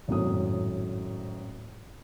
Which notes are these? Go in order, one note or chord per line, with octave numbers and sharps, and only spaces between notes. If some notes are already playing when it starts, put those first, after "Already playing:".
G#1 F#2 A2 A3 D#6